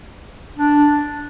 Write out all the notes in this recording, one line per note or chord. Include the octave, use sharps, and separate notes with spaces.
D4